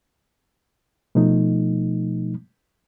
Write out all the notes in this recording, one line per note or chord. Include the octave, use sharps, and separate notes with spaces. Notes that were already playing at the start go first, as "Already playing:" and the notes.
B2 F3 A3 D#4